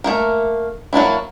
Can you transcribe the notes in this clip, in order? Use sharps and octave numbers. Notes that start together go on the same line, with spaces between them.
A3 A#3 A#4
F#3 A#3 D4 E4